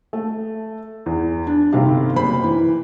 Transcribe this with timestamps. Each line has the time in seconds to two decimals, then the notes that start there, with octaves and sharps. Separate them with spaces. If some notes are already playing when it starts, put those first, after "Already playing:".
0.13 A3
1.06 E2
1.47 D4
1.72 G1 C3 D#3 G4 F5
2.16 F#1 C5 B5
2.43 E3